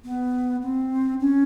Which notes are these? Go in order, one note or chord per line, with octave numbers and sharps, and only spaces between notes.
B3
C4
C#4